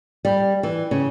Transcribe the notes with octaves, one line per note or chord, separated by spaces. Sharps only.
G3
E3
C#3